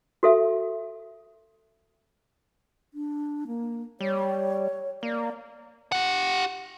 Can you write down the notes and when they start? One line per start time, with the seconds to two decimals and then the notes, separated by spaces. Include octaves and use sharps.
0.23 F#4 A4 E5
2.94 D4
3.47 A#3
4.01 G3 C#5
5.03 A#3 D5
5.92 G4 F#5